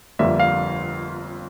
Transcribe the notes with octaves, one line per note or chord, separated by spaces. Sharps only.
G1 F2 D3 G3 A#3 E5
F5